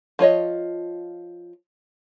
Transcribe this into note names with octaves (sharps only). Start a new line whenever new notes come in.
F3 F4 C#5 D#5